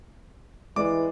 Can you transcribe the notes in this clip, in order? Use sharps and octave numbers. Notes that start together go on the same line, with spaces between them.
E3 G#3 D5 D6